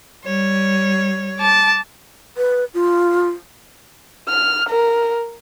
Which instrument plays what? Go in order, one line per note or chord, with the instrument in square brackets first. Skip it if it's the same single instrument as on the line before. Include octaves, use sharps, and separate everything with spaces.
[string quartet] G3 C#5
[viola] A5 D6
[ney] B4
F4
[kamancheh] F6
A#4